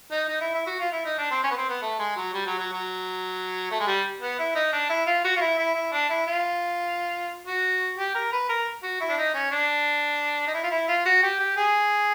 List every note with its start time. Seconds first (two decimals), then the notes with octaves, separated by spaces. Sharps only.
0.11 D#4
0.28 D#4
0.41 E4
0.54 E4
0.66 F#4
0.80 F4
0.92 E4
1.05 D#4
1.18 D4
1.31 C4
1.43 C#4
1.51 B3
1.56 C4
1.69 B3
1.82 A3
1.99 G#3
2.16 F#3
2.33 G3
2.46 F#3
2.59 F#3
2.72 F#3
3.71 A3
3.80 G#3
3.87 G3
4.21 B3
4.39 E4
4.56 D#4
4.73 D4
4.90 E4
5.07 F4
5.24 F#4
5.36 F4
5.41 E4
5.58 E4
5.75 E4
5.93 D4
6.10 E4
6.27 F4
7.47 F#4
7.98 G4
8.14 A#4
8.32 B4
8.49 A#4
8.83 F#4
9.01 E4
9.10 D4
9.18 D#4
9.35 C#4
9.52 D4
10.47 D#4
10.54 E4
10.63 F4
10.71 E4
10.88 F4
11.06 F#4
11.23 G4
11.40 G4
11.57 G#4